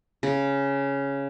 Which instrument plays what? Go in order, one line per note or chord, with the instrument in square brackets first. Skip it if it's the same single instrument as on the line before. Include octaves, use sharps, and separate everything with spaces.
[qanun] C#3